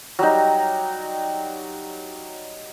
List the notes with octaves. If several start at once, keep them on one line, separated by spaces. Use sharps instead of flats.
F#3 G3 D#4